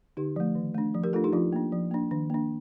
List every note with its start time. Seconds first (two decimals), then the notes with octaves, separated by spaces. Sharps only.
0.17 D3 D#4 G4
0.36 F3 A3
0.55 D#3
0.75 A3 D4
0.94 F3
1.04 G4 A#4
1.13 A3 D4 F4 A4
1.24 D#4 G4
1.33 F3 D4 F4
1.53 A#3 D4
1.72 F3
1.91 A#3 D4
2.11 D#3 D4
2.30 A#3 D4